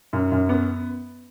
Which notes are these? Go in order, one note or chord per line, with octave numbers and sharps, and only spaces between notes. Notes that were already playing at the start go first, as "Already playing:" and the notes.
F#2
F#2
B3